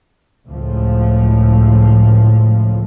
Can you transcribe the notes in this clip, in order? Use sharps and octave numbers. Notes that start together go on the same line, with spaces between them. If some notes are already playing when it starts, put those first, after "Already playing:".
C#2 A2 F3